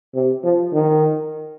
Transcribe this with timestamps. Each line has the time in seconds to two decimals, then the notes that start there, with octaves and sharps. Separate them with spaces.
0.14 C3
0.44 F3
0.73 D#3